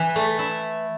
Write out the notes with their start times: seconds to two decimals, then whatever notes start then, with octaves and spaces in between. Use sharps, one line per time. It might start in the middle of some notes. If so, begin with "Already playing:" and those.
Already playing: E3 B4
0.16 A3
0.39 E4